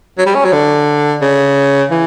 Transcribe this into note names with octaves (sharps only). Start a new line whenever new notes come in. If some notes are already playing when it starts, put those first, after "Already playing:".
F#3
G3
C#4
F#3
D3
C#3
E3